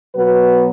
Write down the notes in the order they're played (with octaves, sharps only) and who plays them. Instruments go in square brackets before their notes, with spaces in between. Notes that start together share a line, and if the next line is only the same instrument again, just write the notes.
[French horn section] B2 F#3 B3 F#4 B4